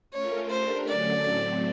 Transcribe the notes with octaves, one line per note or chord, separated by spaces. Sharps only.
A3 C#4 F4 A#4 C#5
A3 D4 G4 A#4 C5
D3 F#3 A3 C#4 D5
A2 F#3 A3 C4